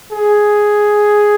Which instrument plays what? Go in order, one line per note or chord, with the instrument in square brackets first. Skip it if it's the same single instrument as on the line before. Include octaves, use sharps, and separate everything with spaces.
[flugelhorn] G#4